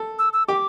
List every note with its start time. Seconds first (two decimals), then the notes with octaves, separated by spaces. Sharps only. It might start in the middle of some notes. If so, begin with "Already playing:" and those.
Already playing: A4
0.19 E6
0.33 E6
0.48 G4 D6